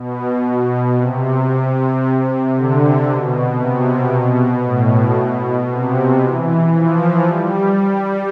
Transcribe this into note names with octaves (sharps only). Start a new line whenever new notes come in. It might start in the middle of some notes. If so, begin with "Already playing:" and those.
Already playing: B2
B2
C3
D3
B2
C3
B2
A2
B2
C3
E3
F3
G3